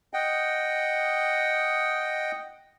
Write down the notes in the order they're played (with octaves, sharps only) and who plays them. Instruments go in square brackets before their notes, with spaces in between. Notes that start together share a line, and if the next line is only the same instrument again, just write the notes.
[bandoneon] D#5 F#5 G5